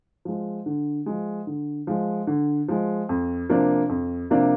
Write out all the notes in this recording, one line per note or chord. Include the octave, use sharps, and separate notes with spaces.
F3 G#3
D3
F3 G#3
D3
F3 G#3
D3
F3 G#3
F2
C3 F3 A#3 D4
F2
C3 F3 A#3 D4